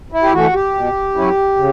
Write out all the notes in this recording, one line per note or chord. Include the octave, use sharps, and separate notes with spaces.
E4
G4
E3 A3 F#4
G4
B2
F#3 C#4 E4
C#3